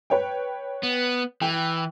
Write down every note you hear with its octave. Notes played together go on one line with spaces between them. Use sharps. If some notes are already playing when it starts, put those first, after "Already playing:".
B4 C#5 G5
B3
E3 G5